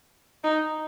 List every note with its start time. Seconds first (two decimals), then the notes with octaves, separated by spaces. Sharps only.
0.44 D#4